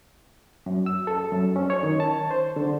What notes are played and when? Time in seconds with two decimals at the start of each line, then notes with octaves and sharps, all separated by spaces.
0.66 F#2
0.86 E6
1.07 A4
1.32 F#2
1.56 C#4
1.70 C#5
1.83 D#3
2.00 A5
2.31 C5
2.56 D3